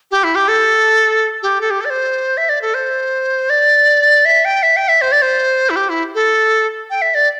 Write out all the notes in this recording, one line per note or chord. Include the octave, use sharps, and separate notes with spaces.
G4
E4
G4
A4
G4
A4
G4
A4
D5
C5
E5
D5
A4
C5
D5
E5
G5
E5
G5
E5
C5
D5
C5
E4
G4
E4
A4
G5
E5
D5